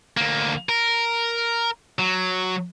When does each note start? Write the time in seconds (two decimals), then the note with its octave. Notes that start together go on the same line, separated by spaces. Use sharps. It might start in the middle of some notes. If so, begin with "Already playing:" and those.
0.17 D2 A#3
0.69 A#4
1.99 F#3